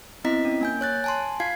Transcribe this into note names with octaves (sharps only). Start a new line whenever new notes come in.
B3 C4 E4 D#5 A#5 B6
C#4
A#3 G#5 G6
C#5 F#6 A6
G#5 A5 C6
F4 F5 G#6 C7